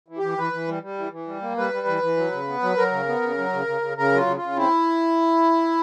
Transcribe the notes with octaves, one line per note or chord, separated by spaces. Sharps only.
E3
E3 G4
E3 B4
E3
G3
G3
E3
E3
G3
A#3
G3 B4
G3
E3
E3
F#3
C#3
B3
F#3
F#3 A#4
C#3
B3
C#3
F#3
C#3
C#3
C#3
C#3 A#4
F#3 F4
C#3
F4
C#3
C4 E4